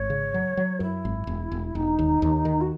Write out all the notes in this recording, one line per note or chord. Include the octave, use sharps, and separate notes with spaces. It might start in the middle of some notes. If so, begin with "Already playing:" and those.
Already playing: G#1 C#5
C#3
F#3
F#3
F#2 E4
G#1
E1
E1
E1 D#4
D#2
D#2
D#3
F#4